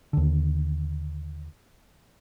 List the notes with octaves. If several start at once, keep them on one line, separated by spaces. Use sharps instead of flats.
D#2 D3